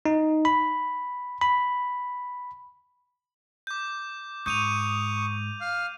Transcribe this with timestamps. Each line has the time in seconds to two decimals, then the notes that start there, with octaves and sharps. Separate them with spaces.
0.06 D#4
0.45 B5
1.41 B5
3.67 D6 G6
4.46 G#2 C#6 D#6 G6 D#7 F7
5.61 F5 F6